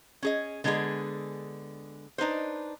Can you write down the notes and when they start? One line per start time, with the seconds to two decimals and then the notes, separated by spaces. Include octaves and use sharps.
0.22 C#4 G#4 D#5
0.64 D3 G#3 B3 D4 G#4
2.18 D4 D#4 B4 C5